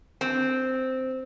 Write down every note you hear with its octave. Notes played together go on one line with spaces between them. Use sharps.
C4